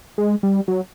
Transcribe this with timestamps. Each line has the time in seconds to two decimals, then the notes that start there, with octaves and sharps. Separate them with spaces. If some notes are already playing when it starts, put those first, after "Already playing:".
0.18 G#3
0.43 G3
0.68 F#3